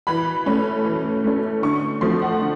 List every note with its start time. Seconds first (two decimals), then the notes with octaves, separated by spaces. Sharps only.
0.07 E3 B5
0.46 A3 C#4
0.85 E3
1.24 A3 C#4
1.62 D3 C#6
2.01 F3 A3 C4 C6
2.22 F#5
2.40 D3